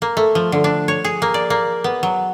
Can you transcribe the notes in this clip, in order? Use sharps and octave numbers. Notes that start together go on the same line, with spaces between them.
A#3
A3
F3
D3
D4
C#5
G#4
A#3
D5
A#3
B3
F#3